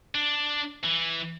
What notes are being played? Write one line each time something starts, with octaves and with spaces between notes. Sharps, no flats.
D4
E3